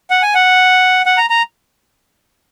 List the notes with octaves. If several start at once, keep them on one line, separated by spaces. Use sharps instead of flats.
F#5
G#5
F#5
F#5
A#5
A#5